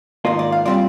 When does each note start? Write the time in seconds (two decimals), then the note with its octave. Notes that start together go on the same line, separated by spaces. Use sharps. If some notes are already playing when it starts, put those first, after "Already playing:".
0.25 G#2 D#3 A#3 F4 D#5
0.39 D5
0.52 F5
0.66 A#2 G3 C4 F4 D5